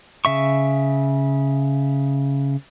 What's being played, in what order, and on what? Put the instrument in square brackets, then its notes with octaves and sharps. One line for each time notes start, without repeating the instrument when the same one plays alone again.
[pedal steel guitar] C#3 E5 C#6